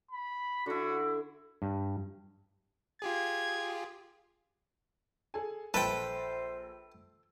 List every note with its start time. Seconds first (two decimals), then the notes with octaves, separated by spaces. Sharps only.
0.11 B5
0.66 D3 E4 F#4
1.62 G2
3.02 F4 G4 G#4 G#6
5.34 G#4 A4 G#5
5.74 A#1 A4 B4 C5 G5 C6